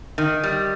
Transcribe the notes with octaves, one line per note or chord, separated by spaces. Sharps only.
D#3
G3